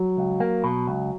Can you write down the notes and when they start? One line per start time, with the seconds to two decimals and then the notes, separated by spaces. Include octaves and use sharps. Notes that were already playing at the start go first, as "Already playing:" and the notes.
Already playing: F#3
0.17 C#2
0.40 A#3
0.64 B2
0.87 C#2